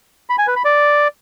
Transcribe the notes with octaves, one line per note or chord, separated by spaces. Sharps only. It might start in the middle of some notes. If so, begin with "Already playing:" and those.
B5
G#5
B4
B5
D5